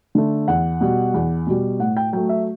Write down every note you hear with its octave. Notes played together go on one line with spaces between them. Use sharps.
D3 A3
E2 F#5
B2 G3
E2
B2 G3
A2 F#5
G5
F#3 A3 G5
E5